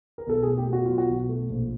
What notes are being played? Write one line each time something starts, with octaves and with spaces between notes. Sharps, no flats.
A#4
B1 A4
G#4
A3
G4
B2 F#4
F#3 F4
F#4
B1
A3
A#1